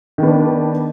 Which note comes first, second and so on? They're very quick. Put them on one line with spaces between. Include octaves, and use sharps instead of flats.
D#3 B3 D4